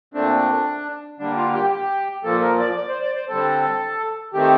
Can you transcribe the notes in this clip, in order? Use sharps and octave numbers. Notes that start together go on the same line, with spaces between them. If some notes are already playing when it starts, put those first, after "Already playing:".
A#2 A3 C4 D4
D3 G3 A#3 D4
F4
G4
G4
A#2 F3 A#3 A4
A#4
D5
D5
C5
D5
C5
D3 G3 C4 A4
D#3 A3 C4 G4